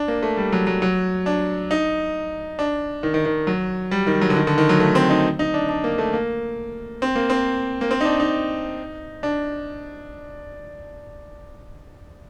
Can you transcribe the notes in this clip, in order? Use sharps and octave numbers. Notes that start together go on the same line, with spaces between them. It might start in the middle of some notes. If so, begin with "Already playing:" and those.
Already playing: D4
A#3
A3
G3
F#3
F#3
F#3
D4
D#4
D4
D#3
D#3
D#3
F#3
G3
D#3
F#3
D3
D#3
D3
D#3
F#3
A3
C4
D#4
D#4
D4
D4
A#3
A3
A#3
C4
A#3
C4
A#3
C4
D#4
D4
D#4
D4